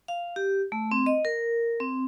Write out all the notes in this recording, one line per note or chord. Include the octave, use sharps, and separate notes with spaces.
F5
G4
A3
C4
D#5
A#4
C4